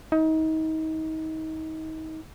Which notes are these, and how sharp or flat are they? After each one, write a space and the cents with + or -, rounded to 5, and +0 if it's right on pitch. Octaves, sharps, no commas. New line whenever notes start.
D#4 +30